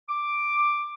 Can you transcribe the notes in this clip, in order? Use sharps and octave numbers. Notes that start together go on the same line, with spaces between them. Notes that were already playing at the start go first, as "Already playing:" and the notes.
D6